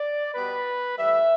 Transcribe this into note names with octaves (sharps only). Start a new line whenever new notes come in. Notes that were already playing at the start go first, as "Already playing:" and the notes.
Already playing: D5
B2 G3 B3 B4
A2 E3 G3 E5